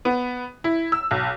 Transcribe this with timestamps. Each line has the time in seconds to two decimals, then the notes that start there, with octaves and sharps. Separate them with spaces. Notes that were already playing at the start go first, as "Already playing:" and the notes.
0.05 B3
0.64 E4
0.92 E6
1.11 B1